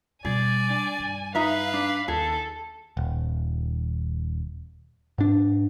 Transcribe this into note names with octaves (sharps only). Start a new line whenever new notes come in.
B2 G3 G#4 D5 G#5
D4
G2
D#4 B4 E5 F5 A#5
D4
D#2 D#4 G#4 A4
D#1
G#2 D4